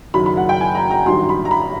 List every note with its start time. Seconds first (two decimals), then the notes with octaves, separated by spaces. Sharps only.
0.14 F#1 F#2 D#3 F#3 B5
0.26 B5
0.37 F#5
0.49 G5
0.61 G#5
0.75 A#5
0.91 A#5
1.06 A1 G2 D#3 F#3 C6
1.29 B5
1.45 A#5
1.51 B5